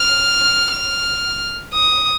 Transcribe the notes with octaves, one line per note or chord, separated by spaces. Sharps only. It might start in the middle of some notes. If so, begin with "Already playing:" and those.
Already playing: F6
F6
D#6